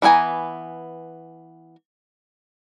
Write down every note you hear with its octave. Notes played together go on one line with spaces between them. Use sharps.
E3 B3 D#4 G#5 A#5